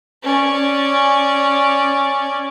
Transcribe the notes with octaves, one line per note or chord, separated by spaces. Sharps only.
C#4 D5